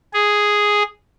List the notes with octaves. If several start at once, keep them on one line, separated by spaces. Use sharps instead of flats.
G#4